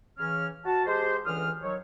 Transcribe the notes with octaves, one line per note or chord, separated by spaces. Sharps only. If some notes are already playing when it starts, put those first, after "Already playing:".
C#3 E3 C#4 F6
F#4 A5
G#3 G4 C5
C#2 D3 E3 D#6 F6
D#3 F#3 C#5